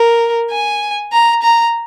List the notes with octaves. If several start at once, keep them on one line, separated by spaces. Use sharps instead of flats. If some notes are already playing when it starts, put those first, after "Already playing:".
Already playing: A#4
G#5
A#5
A#5